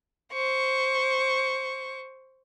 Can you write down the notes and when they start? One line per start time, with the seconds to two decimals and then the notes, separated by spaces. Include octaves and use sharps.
0.33 C5 C#6